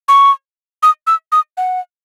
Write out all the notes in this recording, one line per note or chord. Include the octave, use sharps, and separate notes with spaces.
C#6
D#6
E6
D#6
F#5